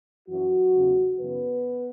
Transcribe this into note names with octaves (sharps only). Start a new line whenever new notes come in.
F#2 E3 F#3 F#4
E2 C#3 E3
F#2 C#3 E3 B3 B4